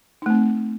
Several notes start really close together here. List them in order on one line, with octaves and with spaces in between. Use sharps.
D#4 A3 C4